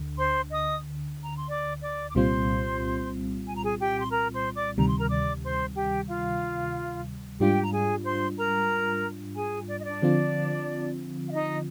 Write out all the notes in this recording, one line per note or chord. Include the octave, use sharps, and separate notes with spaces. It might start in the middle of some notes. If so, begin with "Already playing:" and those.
Already playing: D2 D3
C5 C6
D#5 D#6
A#5
C6
D5 D6
D5 D6
D6
C2 A#2 G3 C4 F4 C5 C6
G#5
A#5
G#4 G#5
G4 G5
C6
A#4 A#5
C5 C6
D5 D6
D2 C3 D#3 G3 A#5
C6
A#4 A#5
D5 D6
C5 C6
G4 G5
F4 F5
G#2 G3 D4 F4 G4 G5
A#5
G#4 G#5
C5 C6
A#4 A#5
G#4 G#5
D5
D#5
D4 D5
D3 F3 C4 F4
F5
D#4 D#5